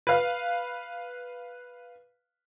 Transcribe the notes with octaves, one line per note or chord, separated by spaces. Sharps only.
B4 F5